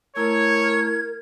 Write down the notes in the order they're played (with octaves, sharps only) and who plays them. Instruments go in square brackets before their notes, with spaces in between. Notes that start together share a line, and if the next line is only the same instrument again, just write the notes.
[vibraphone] A3 E4 A#5 [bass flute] A#4 [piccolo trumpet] C#5 [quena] G#6